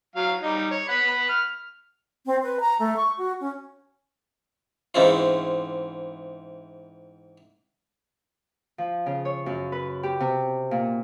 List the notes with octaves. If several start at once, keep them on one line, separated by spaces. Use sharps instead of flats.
F#3 F5
G3 D#4
C#5
F#5 B5
F6
C4
B4
A#5
A3
C#6
F#4
C#4
G#2 E3 G#3 C4 C#4 F4
F3
C#3
C#5
F#2
B4
G4
C3
A#2